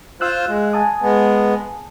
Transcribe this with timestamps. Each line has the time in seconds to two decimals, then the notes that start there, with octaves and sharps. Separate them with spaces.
0.21 F4 C5 F5 E6 F#6
0.48 G#3
0.73 G#5 A5 D#6
1.02 G#3 B3